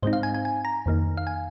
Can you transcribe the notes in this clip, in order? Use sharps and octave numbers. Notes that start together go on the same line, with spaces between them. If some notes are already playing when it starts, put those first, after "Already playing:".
G#2 G#3 C4 D#4 C5
F5
G#5
G#5
G#5
A#5
F2 D#3 A#3 D#4
F5
G#5